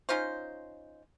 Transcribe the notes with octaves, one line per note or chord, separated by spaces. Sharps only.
C#4 D#4 F4 C5